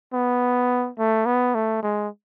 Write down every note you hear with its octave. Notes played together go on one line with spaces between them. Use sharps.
B3
A3
B3
A3
G#3